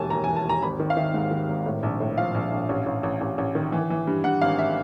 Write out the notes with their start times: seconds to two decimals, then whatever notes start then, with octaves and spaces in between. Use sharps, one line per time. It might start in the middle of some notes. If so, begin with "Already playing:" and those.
Already playing: E1 D#2 E3 G#5 A5
0.10 D#2 A#5
0.24 G#5
0.28 E3
0.36 A5
0.45 D#2 A#5
0.62 G#1 B5
0.80 D#3
0.90 F5
0.97 D#3 E5
1.14 G#2
1.31 D#3
1.48 G#1
1.66 A2
1.83 A#1
2.00 A2
2.17 F3 F5
2.35 A#1
2.52 A#1
2.69 A1
2.86 A1
3.03 A1
3.21 A1
3.38 A1
3.55 D#3
3.72 E3
3.90 E3
4.07 G2
4.24 G2 F#5
4.41 G#1 F5
4.59 E5